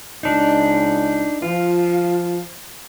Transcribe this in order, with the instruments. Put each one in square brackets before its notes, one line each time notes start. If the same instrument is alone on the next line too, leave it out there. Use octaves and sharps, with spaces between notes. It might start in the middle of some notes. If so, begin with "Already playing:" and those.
[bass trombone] C#2 [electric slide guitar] D4 D#4
[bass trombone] F3 [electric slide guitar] F4